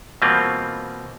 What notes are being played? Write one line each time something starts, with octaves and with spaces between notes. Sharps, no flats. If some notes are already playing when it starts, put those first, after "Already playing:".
B2 E3 G3 A#3 C4 F4